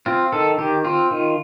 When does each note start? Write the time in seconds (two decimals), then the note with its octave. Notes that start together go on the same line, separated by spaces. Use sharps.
0.06 C4 F4
0.32 D#3 A4
0.58 D#3 G4
0.84 C4 F4
1.11 D#3